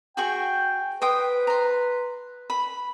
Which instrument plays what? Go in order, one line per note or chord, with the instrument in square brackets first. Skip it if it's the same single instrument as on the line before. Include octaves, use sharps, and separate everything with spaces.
[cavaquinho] F#4 G#4 C#6 [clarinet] G5
[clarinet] B4 [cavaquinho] C5 G5 D#6
[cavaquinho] A#5 C6
B5